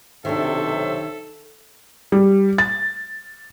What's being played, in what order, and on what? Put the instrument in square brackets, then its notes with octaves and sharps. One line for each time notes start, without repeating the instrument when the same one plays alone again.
[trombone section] B1 C3 [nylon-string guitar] D#3 D4 [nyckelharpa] A4 [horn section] C5 C#5 E5
[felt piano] G3
A6